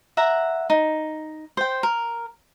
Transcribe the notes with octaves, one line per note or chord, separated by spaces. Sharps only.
E5 F#5 A#5
D#4
C5 G5
A#4